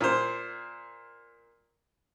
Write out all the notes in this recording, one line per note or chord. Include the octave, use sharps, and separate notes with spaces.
A#2 C5